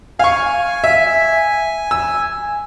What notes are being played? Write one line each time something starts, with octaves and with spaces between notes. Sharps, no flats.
F5 G#5 C#6
E5
E6